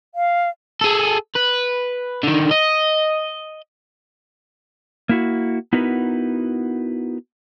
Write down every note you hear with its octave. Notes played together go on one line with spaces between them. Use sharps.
F5
G#4 A4
B4
D3 D#3
D#5
A#3 E4 F#4
B3 D#4 E4 F#4 A#4 B4